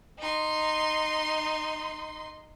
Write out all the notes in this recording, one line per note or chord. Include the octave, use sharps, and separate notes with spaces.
D#4 C6